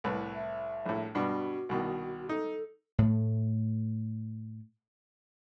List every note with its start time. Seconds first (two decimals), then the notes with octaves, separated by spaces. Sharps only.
0.04 C2 A2 B4
0.35 E5
0.86 A#1 A2
1.15 G2 B2 F#4
1.69 C2 B2 D#3
2.29 D#4 A4
2.98 A2 A3